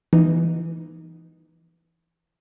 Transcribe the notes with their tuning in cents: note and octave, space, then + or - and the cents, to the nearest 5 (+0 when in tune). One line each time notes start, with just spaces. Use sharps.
E3 +15 B3 +0 D#4 +0